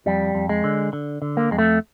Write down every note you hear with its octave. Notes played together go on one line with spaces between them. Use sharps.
F2 G3
F2
G#3
D3
D3
D3
A#3
F2 G#3
A3